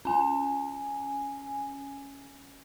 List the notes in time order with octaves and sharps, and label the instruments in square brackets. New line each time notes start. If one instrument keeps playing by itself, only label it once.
[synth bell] C#4 G#5